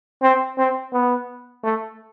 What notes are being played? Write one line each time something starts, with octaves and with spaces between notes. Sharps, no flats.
C4
C4
B3
A3